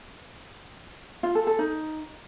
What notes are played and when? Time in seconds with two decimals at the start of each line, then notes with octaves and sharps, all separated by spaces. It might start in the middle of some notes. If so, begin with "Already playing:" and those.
1.23 F4
1.35 A4
1.47 A4
1.59 D#4